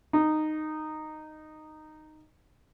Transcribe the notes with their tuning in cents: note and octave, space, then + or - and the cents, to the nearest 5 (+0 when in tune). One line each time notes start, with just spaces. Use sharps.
D#4 -10